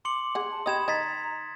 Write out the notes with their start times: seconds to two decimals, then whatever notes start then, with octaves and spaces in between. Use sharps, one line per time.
0.05 C6 D6 C#7 F#7
0.35 G#4 F#5
0.51 A5
0.66 G4 D#5 B5 D#6 G#6 E7
0.88 D#3 D#5 A#5 G#6 A6 B6